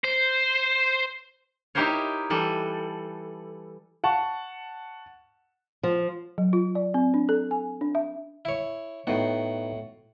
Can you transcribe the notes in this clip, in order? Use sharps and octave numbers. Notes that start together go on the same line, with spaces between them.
C5
D#4 E4 G4 A#4 C5 C#5
E3 G3 A4
F#5 A5 C#6
F3
F#3
F4
D5
C4
D4
A4
G#5
D4
E5
E4 C#5
A2 B3 D#4 F#4 G5